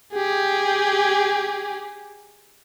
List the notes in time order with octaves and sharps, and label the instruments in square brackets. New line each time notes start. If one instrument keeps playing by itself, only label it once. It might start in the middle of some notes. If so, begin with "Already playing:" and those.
[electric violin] G4 G#4